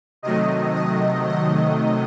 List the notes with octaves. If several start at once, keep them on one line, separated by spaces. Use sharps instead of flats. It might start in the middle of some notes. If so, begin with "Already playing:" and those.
C3 D#3 F#3 A3 D#5
D#5
D#5